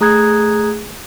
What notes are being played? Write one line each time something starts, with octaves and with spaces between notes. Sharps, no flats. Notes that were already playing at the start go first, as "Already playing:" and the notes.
A3 G#4 A#5 D#6 F#6 G#6